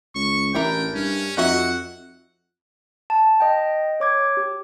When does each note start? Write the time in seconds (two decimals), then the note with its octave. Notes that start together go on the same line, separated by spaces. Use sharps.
0.15 C#2 C#6
0.55 A1 D4 E4 A#4 G5
0.94 G2 C#4
1.37 F2 D#4 F#4 E5 F#5
3.10 A5
3.40 D#5 G5
4.00 C#5 D6 G#6
4.37 G4